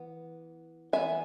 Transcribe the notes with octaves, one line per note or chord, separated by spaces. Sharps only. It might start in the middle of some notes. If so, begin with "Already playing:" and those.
Already playing: E3 B3
E3 B3 E5 G#5